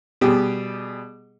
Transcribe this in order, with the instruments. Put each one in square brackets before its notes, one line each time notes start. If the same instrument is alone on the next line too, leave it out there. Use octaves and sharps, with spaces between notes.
[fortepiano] B2 G3 G4 G#4